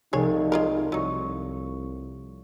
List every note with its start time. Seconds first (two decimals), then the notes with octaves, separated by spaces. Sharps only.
0.13 C2 F3 A3 D#4 G#4 C#5
0.52 G#3 F4 A#4
0.92 C2 F#3 D#4 C#5 C#6